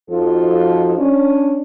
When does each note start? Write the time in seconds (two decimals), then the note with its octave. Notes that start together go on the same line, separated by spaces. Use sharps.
0.11 F2 F3 D#4 F4 F#4 A4
0.97 C#4 D4